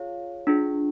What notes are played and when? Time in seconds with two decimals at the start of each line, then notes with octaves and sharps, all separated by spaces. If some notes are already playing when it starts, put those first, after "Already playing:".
Already playing: F4 G#4 C#5 F5
0.47 D4 F4 G#4